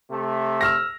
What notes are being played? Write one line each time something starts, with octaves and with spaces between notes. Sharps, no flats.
C3 A3
E6 F6 A#6